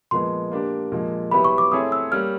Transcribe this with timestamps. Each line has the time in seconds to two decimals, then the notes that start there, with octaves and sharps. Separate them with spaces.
0.11 A#2 F3 G#3 B3 C6
0.52 A#3 D4 G4
0.92 A#2 F3 G#3
1.31 F#3 B3 E4 G4 B5
1.45 C#6
1.58 D6
1.71 A3 C4 E4 G#4 C#5 D#6
1.92 E6
2.11 G3 A#3 C#4 F6